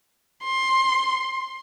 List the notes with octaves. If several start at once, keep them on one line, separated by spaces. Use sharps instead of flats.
C6